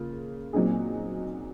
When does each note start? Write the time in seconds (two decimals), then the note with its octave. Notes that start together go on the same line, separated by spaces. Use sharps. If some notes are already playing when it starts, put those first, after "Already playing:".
Already playing: C#3 A#3 F4
0.53 A#2 F#3 C4 D#4 G#4